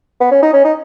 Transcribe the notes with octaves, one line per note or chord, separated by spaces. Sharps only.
B3
C#4
D#4
C#4
D#4